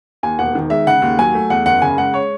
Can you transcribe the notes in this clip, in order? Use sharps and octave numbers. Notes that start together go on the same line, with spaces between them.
D#2 G#5
E1 F#5
D#3
G#3 E5
C#3 F#5
D#2
F#3 G#5
A3
E2 F#5
F#1 F#5
C#3 G#5
G#3 F#5
C#5